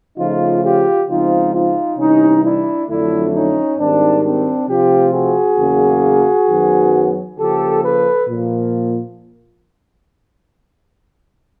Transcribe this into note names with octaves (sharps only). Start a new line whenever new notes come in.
C#3 F3 A3 D#4 F4
F4 G4
C#3 F3 G#3 C4 D#4 F4
D#4 F4
C3 E3 G3 C#4 D#4
D4 E4
F2 D3 F#3 A3 D4 E4
C#4 D#4
G#2 D#3 G3 C4 D4
C4 D4
C3 F3 A3 C4 F4 G4
F#4 G#4
E2 C#3 F#3 A#3
F#2 D#3 F#3 B3
C#3 F3 A#3 G4 A4
A4 B4
A#2 F3 A#3